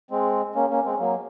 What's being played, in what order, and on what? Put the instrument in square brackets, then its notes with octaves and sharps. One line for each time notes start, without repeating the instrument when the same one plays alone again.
[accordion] G#3 C4
A#3 C#4
A#3 C#4
G#3 C4
F#3 A#3